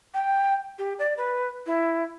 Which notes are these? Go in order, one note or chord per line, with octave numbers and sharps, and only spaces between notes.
G5
G4
D5
B4
E4